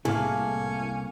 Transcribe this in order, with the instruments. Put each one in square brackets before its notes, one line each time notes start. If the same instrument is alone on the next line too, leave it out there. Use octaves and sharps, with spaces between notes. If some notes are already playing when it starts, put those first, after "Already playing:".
[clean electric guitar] C2 A#3 [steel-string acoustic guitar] A2 [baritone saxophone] C#4 [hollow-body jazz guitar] E4 G#4 A4